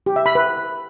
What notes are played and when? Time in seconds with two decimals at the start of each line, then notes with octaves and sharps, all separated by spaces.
0.06 G4
0.16 E5
0.26 B5
0.35 B4